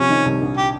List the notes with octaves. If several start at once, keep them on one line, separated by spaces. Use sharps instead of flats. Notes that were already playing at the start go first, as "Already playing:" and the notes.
Already playing: C3 F3 C#4
D#3
C2
A#1
G4